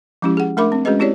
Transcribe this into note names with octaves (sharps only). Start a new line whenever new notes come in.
F3 G#3 C#4 E4 G4
G#4 F#5
A3 D4 A#4 E5 B5 D6
C4
G#3 C#4 F#4 G#4 B4 D#5
C4 E4 G4 C#5 D5